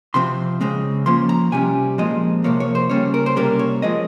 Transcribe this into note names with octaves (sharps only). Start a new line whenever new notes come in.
C3 F3 C4 C6
C#3 G#3 C4
F3 A#3 C#4 C6
A#5
C3 G3 C#4 G#5
A#2 F3 G#3 C4 D#5
C3 F3 A#3 C#5
C#5
C5
C#3 G3 A#3 C#4 C#5
A#4
C5
C3 G3 A#3 C#4 A#4
C#5
F3 G#3 C4 D#5